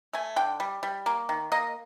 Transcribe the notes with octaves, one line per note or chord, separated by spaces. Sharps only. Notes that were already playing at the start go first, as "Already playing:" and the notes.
A3 G#5
D3 G5
G3
G3
A#3
D#3
A#3 D#5